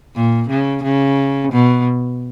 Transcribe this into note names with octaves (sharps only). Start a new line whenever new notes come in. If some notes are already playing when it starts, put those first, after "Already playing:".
A#2
C#3
C#3
B2